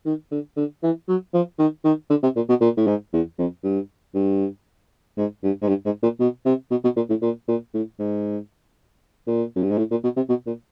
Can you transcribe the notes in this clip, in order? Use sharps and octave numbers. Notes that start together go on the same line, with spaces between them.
D#3
D3
D3
E3
F#3
F3
D#3
D#3
D3
C3
A#2
B2
A#2
A2
G#2
E2
F2
G2
G2
G#2
G2
G#2
G2
G#2
A#2
B2
C3
B2
B2
A#2
A2
A#2
A#2
A2
G#2
A#2
F#2
G2
G#2
A2
A#2
B2
C3
B2
A#2